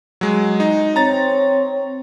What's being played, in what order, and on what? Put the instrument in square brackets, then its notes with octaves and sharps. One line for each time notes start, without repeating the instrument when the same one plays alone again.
[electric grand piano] F#3 G#3
D#4
[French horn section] C4 C#5 [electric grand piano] A#5 A6